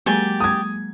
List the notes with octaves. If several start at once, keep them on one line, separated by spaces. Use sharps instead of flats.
F#3 G#3 A#3 G4 D5 G#5
D#6 G#6